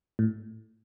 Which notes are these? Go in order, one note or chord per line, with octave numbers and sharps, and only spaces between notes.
A2